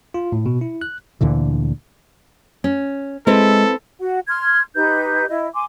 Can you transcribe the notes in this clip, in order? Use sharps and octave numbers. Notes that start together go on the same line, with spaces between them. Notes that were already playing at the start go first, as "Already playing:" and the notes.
F4
A2
B2
E4
F#6
D2 A#2 D3 E3
C#4
G#3 C4 E4 A4 B4
F#4 F#5
C6 F6 G#6
D#4 G4 B4 G6
E4 D#5
G#5 C6 D6